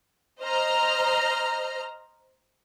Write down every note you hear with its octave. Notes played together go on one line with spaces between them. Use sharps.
C5 D#5 A#5 F6